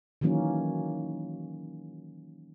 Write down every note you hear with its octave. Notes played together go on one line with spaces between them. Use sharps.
D#3 E3 F#3 A#3 C#4